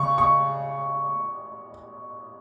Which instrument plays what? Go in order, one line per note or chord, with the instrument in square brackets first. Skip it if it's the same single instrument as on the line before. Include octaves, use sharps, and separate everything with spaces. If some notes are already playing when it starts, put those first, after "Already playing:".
Already playing: [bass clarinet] C#3 [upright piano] C#6
[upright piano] C#6